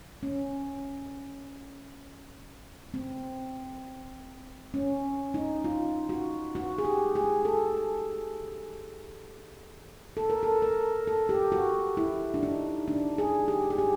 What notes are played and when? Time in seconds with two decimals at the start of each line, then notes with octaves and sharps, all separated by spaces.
0.23 C#4
2.94 C4
4.74 C#4
5.34 D#4
5.64 F4
6.09 F#4
6.55 F#4
6.78 G#4
6.85 G4
7.15 G#4
7.45 A4
10.17 A4
10.30 A#4
10.43 A4
10.62 A#4
11.07 A4
11.29 G4
11.52 F#4
11.97 E4
12.34 D4
12.43 D#4
12.88 D4
13.18 G#4
13.48 G4
13.70 G#4
13.78 G4